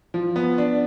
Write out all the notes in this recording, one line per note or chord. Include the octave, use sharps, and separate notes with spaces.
F3
B3
D4